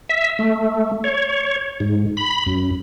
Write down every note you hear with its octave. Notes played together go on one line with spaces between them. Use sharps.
E5
A3
C#5
G#2
B5
F#2